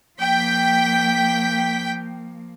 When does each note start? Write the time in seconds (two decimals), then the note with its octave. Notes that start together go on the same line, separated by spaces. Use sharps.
0.19 F3 A#3 G5 B6